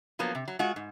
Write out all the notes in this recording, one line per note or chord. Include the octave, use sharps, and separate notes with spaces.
F3 F#3 A#3 B3
C3
F#3
G#3 F4 F#4 F#5
G#2